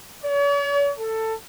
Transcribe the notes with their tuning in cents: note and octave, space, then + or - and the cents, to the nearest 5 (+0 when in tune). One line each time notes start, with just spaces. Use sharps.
C#5 +45
A4 +15